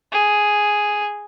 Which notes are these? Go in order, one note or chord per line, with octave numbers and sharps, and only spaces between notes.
G#4